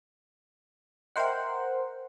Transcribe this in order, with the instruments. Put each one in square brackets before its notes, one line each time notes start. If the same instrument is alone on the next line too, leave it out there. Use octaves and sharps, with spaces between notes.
[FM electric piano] A#4 C5 F#5 [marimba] D#5 E5 G5